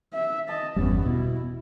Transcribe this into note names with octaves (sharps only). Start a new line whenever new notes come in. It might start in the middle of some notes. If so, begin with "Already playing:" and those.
E5
D#5 A5
G1 E2 G3 B3 C#4
B2 E4